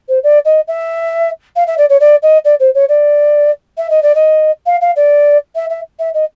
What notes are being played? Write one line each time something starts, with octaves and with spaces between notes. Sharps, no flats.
C5
D5
D#5
E5
F5
E5
D5
C#5
D5
D#5
D5
C5
C#5
D5
E5
D#5
D5
D#5
F5
F5
D5
E5
E5
E5
D#5